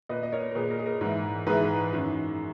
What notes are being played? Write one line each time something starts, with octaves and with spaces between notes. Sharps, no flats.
A#2 B4 D#5
D#5
A#4 C#5
A#4
A#2 G#4 B4
A#4
G#4
A#4
G#2 E3
G#2 E3 G#4 B4
F#2 D#3